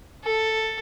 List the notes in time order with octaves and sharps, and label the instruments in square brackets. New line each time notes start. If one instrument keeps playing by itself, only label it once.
[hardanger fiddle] A4